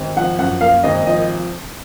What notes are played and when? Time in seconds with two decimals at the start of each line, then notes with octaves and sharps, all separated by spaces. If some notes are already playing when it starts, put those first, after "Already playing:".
Already playing: G#1
0.17 F3 F#5
0.39 F#2 F#5
0.61 A#3 F5
0.83 G#1 D#5
1.06 F3 D#5